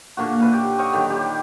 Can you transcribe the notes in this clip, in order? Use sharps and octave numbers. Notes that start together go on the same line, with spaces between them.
A#2 D3 A#3 F#4
A#2 B4 E5
G4 G5
D#5 F5 G5 C#6
D3 D#3 F#3 G4
G4